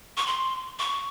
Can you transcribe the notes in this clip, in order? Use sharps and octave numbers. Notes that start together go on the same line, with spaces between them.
C#6
C6
C#6